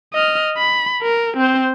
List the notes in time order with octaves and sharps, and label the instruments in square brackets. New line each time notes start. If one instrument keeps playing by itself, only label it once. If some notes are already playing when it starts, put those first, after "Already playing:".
[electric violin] D#5 F6
B5
A#4
C4 C5